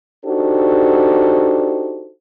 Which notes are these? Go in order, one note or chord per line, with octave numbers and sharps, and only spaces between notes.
D4 D#4 F#4 G4 A4 C5